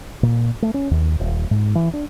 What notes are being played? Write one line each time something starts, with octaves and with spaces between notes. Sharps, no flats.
A#2
A3
C#4
D#2
D#1
G#2
E3
D4